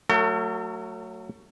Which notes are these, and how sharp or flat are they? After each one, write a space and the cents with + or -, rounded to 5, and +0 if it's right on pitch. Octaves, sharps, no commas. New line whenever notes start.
F#3 +0 A3 +25 A4 +45